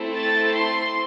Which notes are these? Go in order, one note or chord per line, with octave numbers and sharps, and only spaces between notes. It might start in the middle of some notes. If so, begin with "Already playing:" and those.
Already playing: A3 C4 E4 A4
A6
C6